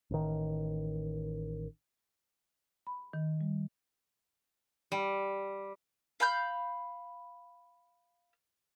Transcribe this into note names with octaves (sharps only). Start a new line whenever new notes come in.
A1 D#3
B5
D#3
G3
G3
F5 B5 G6